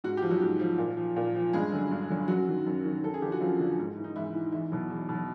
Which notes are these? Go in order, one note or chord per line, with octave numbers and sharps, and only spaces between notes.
G#2 F#4
F3 G4
F#3 F#4
G#2
F3
A#2
F3
A#2
F3
G2 G#3 G#4
D3 F#3
G2
D3 F#3
F#2 F#3 F#4
D#3 F#3
F#2
D#3 F#3
F#2 A4
G#4
D3 F3 G4
F#4
F#2 F3 F4
D3 F3
G#2
E3
D#4
G#2 E3 E4
E3
E2 E3 E4
B2 F#3
E2
B2 F#3